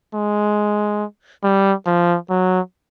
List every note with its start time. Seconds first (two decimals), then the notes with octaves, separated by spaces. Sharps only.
0.14 G#3
1.43 G3
1.86 F3
2.30 F#3